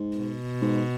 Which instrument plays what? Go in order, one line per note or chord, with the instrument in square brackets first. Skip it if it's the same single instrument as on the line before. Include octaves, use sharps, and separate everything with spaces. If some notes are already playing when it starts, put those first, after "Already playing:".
Already playing: [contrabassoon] G#2
[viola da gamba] B2
[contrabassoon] G#2